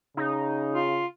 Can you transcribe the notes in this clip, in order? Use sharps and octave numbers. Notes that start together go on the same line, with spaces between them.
C#3 D#4
F4